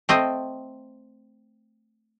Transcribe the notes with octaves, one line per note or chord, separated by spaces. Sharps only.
A3 C4 D#5